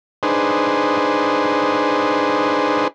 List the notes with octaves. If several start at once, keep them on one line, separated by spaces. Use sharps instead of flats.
D4 D#4 G#4 B4 C5